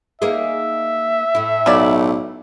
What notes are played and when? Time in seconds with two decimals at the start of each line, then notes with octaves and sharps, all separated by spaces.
0.22 A#3 D#4 G#4 E5
1.35 A2 E4
1.66 B1 C#3 D5